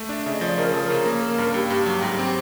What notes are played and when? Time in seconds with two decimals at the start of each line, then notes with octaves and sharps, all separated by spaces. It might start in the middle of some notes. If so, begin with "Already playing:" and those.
Already playing: A3
0.09 D4 E5
0.22 C#3 E5
0.34 D#5
0.41 F3 D5
0.57 C#3 A#4
0.70 F3 A4
0.82 A#4
0.90 C#3
1.06 A#3
1.22 A#3
1.38 G2
1.54 G2 G4
1.70 G2
1.86 F#3
2.02 G#2
2.19 C4